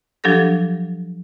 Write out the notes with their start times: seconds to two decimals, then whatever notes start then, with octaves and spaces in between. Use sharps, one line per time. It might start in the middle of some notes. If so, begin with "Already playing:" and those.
0.24 F3 F#3 D4 G4 A4 A#6